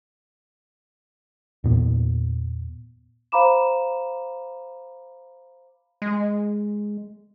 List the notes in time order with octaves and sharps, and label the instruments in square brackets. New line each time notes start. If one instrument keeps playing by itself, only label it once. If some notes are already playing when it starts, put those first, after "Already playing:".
[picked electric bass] E2 A#2 B3
[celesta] C5 F5 A#5 B5 D6 E7
[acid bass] G#3